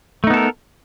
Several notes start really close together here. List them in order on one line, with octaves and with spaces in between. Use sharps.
A3 D#4 B3 A4 A#4